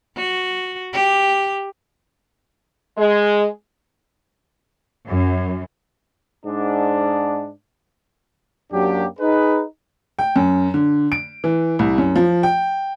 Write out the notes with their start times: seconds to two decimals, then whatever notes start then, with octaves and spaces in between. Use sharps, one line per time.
0.16 F#4
0.93 G4
2.97 G#3
5.07 F#2
6.46 G#2 D4
8.73 F#2 F#3 A#3 D4 G4
9.19 D#4 G#4 B4
10.19 G5
10.36 F#2
10.74 D3
11.12 D7
11.44 E3
11.79 C2
11.98 F#2
12.16 F3
12.43 G5